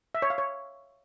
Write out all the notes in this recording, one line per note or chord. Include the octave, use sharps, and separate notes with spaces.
E5
C#5
F5
C#5